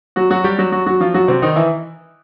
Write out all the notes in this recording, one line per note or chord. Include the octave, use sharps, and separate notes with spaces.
F#3 F#4
F#3 F#4
G3 G4
F#3 F#4
F#3 F#4
F#3 F#4
F3 F4
F#3 F#4
C3 C4
D#3 D#4
E3 E4